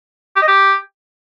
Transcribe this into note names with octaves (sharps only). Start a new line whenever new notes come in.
G4
D#5
G4